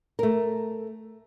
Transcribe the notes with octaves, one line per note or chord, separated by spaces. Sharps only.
A3 A#4